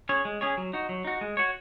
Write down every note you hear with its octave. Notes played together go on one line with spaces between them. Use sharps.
C#4 G#4 C#5
G#3
C#4 G#4 C#5
F#3
D#4 F#4
F#3
D#4 F#4
G#3
F#4 C#5